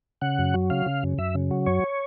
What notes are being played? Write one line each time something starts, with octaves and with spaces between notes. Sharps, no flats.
C#3 F#5
F#2
F#3
C#3 F5
C#3
F#2
F#2 E5
C#3
F#3
F#2 C#5